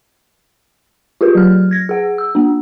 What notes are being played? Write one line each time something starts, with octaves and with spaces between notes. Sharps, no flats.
F4 G4 G#4 B4
F#3 F6
G#6 A#6
G#4 F#5
E6
A#3 D4